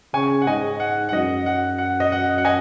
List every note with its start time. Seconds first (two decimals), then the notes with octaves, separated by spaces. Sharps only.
0.14 C#3 G#5 C#6
0.42 F#5
0.47 G#2 D#5 G#5
0.80 F#5
1.09 F#5
1.13 F#2 D#5
1.46 F#5
1.78 F#5
2.00 D#5
2.12 F#5
2.38 F#5
2.45 D#5 G#5